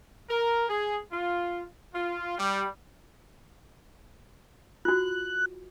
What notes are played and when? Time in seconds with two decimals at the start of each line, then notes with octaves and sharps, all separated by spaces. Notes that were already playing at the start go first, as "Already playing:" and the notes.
0.29 A#4
0.69 G#4
1.12 F4
1.95 F4
2.37 G3
4.85 F4 F#4 F#6